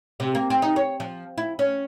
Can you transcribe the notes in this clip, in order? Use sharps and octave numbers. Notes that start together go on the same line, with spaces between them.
C3
A#3
C4
D#4
C#5
F3
E4
C#4